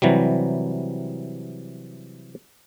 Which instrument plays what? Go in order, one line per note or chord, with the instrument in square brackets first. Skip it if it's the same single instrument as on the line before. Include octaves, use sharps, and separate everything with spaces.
[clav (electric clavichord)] C3 E3 F#3 G3